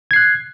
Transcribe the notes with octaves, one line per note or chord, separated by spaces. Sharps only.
F#6 G#6 C7